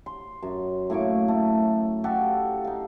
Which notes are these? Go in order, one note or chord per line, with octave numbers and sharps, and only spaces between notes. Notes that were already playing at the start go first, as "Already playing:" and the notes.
C6
F#2
A2 A#3 C#6 D6
A3
F#4 G4 A4 F5
D#4 F5